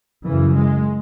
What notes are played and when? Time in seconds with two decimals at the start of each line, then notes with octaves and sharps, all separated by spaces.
0.24 F#2 C#3 E3
0.54 G#3